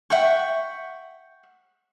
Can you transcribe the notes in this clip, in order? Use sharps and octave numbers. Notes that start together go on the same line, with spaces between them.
E5 F#5 G5 C#6